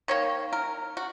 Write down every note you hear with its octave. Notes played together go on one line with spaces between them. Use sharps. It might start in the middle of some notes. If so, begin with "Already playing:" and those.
D#3 A#3 C#5
A#4
F#4